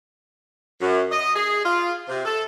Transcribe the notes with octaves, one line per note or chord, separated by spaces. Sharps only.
F#2
D#5
G#4
F4
C3
A4